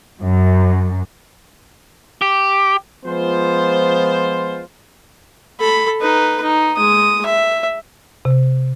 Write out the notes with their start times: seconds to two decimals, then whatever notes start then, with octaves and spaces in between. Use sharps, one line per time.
0.20 F#2
2.22 G4
3.06 F3 G#3 B3 F4 C5
5.59 A4 B5
6.00 D#4 B4
6.42 D#4
6.76 G#3 D#6
7.26 E5
8.25 C3